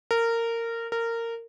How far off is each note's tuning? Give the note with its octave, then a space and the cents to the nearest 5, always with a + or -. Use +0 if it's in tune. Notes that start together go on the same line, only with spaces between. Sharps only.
A#4 -20
A#4 -20